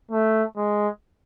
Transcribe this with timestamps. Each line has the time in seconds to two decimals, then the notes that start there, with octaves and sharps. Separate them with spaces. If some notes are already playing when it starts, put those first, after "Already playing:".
0.11 A3
0.56 G#3